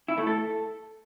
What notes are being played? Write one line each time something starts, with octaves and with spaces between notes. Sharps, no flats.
E4
A3
A4